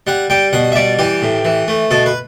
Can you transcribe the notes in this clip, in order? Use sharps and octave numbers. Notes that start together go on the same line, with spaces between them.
G3 F#5
G3 G5
B2 F#5
E5
G3 D5
E3 G4
A2
E3
A3
B2 A4
B4